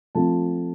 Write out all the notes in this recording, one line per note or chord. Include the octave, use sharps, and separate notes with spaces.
F3 A3 C4 F4 A5